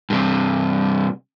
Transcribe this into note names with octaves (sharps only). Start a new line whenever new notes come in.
G2 C3